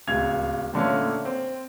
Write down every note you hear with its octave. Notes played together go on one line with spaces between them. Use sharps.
D1 C#2 G#6 F7
A#2 D3 A3 A#3 C#4
C4